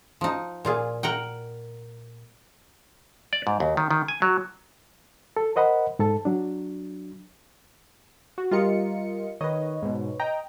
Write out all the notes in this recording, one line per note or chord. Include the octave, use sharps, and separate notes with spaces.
F3 D#4
A#2 F4 G#4
A#4 F#5 G5
D5
G#2
D#2
D#3
D#3
G#5
F#3
A4
A#4 C5 D#5 F#5 B5
G#2 A4 A5
F#3 D4
F#4
G3 F4 G4 A#4 D#5 C#7
D#3 B4 C#5 D#5
G#2 B2
D#5 G5 A#5